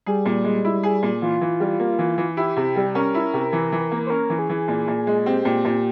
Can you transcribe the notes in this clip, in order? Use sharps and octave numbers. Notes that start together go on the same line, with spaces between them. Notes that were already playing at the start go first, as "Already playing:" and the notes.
G3 G#4
A#2
G#3
E4
G#4
A#2
E3 F4
E3
G3
A#3
E3
E3
E4 G4
C3
G3
C#4 A#4
E4
C3
E3
E3
A#3
C5
C#4 A#4
E3
G#4
E3
A#2
A#2
G#3
C4 G4
A#2
A#2